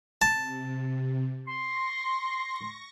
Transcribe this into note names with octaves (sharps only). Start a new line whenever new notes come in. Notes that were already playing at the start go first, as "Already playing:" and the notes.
C3 A5
C6 C#6 A#6